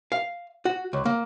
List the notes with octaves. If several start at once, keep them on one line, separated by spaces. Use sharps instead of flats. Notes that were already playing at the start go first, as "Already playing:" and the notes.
F5
F#4
C#2
A#3